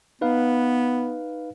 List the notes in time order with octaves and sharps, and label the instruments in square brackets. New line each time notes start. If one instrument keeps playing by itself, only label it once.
[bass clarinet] B3 [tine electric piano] D#4 B4 F5